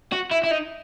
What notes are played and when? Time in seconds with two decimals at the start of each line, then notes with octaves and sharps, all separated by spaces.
0.13 F#4
0.31 E4
0.44 E4
0.51 D#4